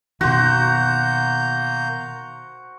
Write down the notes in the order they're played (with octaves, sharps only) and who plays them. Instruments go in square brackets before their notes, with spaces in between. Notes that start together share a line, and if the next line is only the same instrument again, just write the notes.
[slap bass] B2 D#3 [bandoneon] A#3 A#5 G6 [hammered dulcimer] F#4 C5